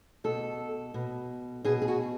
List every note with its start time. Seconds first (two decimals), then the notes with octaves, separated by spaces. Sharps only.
0.24 B2 A4
0.94 B2
1.65 B2 G#4
1.82 G#4
1.88 F#4